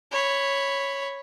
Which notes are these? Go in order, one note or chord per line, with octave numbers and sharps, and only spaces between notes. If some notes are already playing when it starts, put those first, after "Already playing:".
C#5 B5